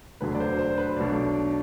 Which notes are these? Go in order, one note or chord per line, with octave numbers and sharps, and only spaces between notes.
E1 D2 D3 F#3 B4
D5
C5
C5
B4
B1 B2 A3 D4